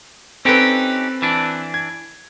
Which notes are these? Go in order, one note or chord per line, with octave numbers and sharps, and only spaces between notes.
C4 C#4 D#4 G4 A4 B4
E3 D4
G#6